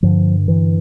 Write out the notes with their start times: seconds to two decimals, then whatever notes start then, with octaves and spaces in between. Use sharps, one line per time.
0.03 G2 D3 F3
0.48 E3